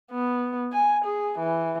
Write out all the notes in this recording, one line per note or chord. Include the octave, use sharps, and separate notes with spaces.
B3
G#5
G#4
E3